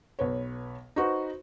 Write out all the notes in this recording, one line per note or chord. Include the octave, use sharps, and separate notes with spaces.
B1 B4 C#5
D#4 F#4 B4 C5